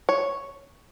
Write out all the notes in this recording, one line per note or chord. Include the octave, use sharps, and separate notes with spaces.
C#5